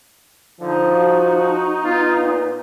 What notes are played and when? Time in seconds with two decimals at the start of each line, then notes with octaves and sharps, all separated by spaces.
0.61 D3 F3 D#4
0.92 F#4
1.84 B3 F4
2.22 A#2